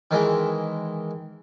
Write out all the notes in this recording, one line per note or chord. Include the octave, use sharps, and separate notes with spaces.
D#3 E3 G#3